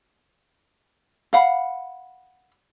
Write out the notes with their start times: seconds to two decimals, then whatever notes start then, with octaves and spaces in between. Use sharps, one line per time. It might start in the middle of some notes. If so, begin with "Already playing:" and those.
1.33 F5 F#5 B5